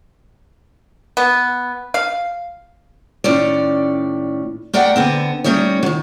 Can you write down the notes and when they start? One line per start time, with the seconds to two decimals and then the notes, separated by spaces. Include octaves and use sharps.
1.17 B3
1.94 F5
3.24 A2 D#3 C#4 D5
4.73 A3 A#4 D5 F#5 G5
4.96 D3 B3 C4
5.44 G3 A3 C#4 D#4 C#5
5.83 D#3 F#3